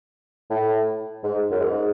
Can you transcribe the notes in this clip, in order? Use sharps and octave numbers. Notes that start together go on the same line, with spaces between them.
A2
G#2
F#2
G#2